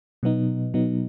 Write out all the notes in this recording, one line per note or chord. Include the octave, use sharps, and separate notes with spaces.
B2 F#3 B3 D#4
B2 F#3 B3 D#4